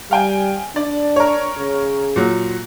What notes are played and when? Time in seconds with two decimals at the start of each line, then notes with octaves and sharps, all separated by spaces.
0.11 G3 F5 G5 G#5
0.76 D4 D5
1.16 A#4 C#5
1.57 C#3
2.16 A#2 F#3